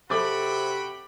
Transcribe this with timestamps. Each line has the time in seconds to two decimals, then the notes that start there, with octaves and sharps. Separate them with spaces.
0.10 C3 F#4 A4 G5 B5 D6 A6